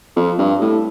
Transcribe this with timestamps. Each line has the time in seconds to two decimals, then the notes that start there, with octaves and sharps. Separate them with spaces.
0.16 F2
0.38 G2
0.61 A2